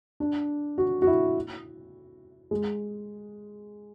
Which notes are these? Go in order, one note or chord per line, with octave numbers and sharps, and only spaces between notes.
D4
F#4
F#4
E4
G#3